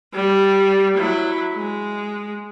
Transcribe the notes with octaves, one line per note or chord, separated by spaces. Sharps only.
G3
F#3 E4
G#3